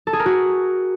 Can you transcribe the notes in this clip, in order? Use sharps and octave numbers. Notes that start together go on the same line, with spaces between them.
A4
G#4
A#4
F#4